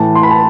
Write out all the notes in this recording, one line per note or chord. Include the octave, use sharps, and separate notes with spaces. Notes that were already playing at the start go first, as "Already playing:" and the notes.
Already playing: A2 E3 A5
C6
B5
A5